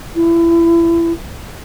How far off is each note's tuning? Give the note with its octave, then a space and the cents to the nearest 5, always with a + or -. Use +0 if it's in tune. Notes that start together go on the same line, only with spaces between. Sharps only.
E4 +30